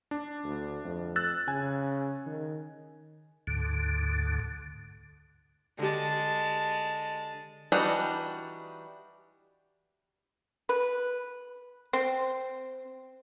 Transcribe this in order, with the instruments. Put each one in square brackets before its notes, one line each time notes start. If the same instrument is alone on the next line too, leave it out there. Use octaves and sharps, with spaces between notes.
[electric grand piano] D4
[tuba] D2
F2
[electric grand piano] E6 F#6 A6
[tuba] C#3 [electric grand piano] G#5
[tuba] D#3
[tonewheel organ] D2 G#2 D3
[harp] D3 G4 [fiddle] G#3 A5
[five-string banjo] E3 G3 D4 D#4 F#4
[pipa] B4
C4